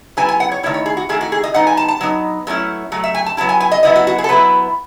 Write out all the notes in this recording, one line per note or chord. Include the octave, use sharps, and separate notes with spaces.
F#3 B3 E4 G#5
G#5
F#5
C#5
D#3 A3 E4 C#5
C#5
G#4
F#4
D#3 A3 E4 G#4
F#4
G#4
D#5
F#3 B3 D#4 F#5
G#5
A5
A5
F#3 B3 D#4
F#3 A3 C#4 E4
F#3 A3
E5
G#5
A5
F#3 B3 E4 A5
G#5
G#5
D#5
F#3 B3 E4 D#5
F#4
F#4
G#4
A4
F#3 B3 E4 B4